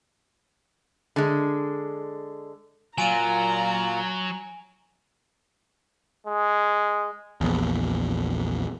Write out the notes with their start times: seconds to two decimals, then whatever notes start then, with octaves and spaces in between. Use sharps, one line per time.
1.16 D3 G#3
2.98 A#2 F#3 F4 G#5 A#5 D7 D#7
6.27 G#3
7.41 A#1 E2